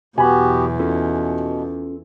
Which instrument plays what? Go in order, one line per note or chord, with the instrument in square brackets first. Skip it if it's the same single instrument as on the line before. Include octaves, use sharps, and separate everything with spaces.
[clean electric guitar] B1 B5 [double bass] E2 [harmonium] B3 F#4 G4 [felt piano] G#5
[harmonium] B2 [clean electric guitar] C#4 F4 A4